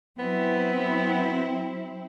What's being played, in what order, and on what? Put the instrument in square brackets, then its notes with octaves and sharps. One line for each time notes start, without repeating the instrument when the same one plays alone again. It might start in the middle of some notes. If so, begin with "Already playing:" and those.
[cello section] F#3 C4 E4 [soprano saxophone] B3